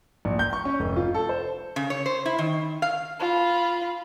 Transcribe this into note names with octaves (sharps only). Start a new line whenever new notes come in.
A#1
G6
C#6
C#4
F1
F4
A4
C5
C#3
C#5
C5
E4
D#3
F5
F4 B5